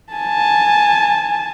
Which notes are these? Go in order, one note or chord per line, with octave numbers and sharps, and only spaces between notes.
G#5 A5